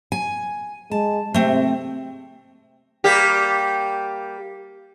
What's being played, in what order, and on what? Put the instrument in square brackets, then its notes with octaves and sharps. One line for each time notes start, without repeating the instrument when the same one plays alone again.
[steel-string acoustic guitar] G#5
[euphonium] G#3 [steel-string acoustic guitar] A5
[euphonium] C3 [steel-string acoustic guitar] A3 C4
[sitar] G3 A#3 G4